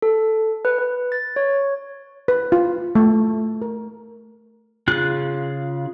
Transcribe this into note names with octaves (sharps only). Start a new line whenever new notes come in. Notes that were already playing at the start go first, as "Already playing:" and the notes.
A4
B4
B4
A6
C#5
B4
F4
A3
A#4
C#3 F4 F#6